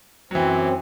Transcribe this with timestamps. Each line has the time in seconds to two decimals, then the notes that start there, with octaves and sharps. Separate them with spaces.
0.31 F#2 E3 F#3 C4